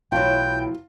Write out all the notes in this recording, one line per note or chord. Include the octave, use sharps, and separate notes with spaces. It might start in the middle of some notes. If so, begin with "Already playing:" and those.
B1 A2 E3 F#3 F4 G5